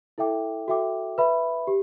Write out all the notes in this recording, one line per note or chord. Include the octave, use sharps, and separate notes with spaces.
E4 A4 E5 G5 D6
F#4 A4 E5 G5 D6
B4 E5 B5
G4